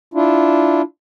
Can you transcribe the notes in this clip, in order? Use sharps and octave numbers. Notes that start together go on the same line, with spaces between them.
D4 E4 F4